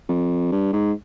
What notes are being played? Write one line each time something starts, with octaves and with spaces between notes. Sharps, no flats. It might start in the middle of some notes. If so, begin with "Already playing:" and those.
F2
G2
G#2